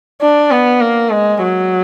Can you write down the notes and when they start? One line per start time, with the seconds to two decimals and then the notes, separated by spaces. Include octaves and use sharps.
0.21 D4
0.51 B3
0.81 A#3
1.11 G#3
1.42 F#3